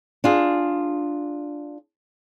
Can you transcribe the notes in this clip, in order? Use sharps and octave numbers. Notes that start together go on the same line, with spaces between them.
D4 F4 G#4